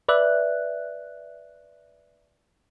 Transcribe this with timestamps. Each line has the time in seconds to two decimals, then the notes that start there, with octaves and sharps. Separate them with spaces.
0.08 B4 D5 E5 F#6